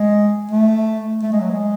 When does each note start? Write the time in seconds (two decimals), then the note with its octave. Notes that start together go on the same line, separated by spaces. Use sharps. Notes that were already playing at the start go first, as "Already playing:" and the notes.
Already playing: G#3
0.51 A3
1.23 A3
1.32 G#3
1.41 F#3
1.50 G#3